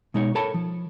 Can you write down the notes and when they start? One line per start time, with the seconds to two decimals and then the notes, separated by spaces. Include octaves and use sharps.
0.14 B2 G#3 D#4 C#5
0.35 A4 A#4 C#5 A5 B5
0.54 F3